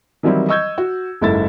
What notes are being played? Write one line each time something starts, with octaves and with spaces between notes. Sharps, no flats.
D#3 E3 F#3 G3 C4 E4
D#5 C#6 E6 G6 G#6
F#4
F#1 G#2 E4 A4 E5 A6